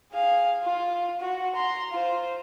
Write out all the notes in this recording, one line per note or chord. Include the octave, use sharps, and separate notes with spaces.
G#4 F5
F4
F#4
A#5 C6
F4 C5